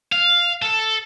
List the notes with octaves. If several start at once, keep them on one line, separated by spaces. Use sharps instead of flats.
F5
A4